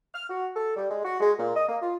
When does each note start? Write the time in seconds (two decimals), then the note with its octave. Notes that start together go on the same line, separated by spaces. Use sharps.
0.14 F6
0.29 F#4
0.56 A4
0.76 G3
0.90 G#3
1.05 F#4
1.20 G#3
1.39 A#2
1.56 D#5
1.69 A#3
1.81 F4